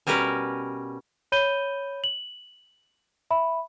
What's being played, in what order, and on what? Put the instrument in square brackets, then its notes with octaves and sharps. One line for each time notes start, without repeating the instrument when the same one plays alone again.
[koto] B2 G3 C#4 A#4 B4
[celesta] C#5 B5 G6 D#7 G7
F#7
E5 B5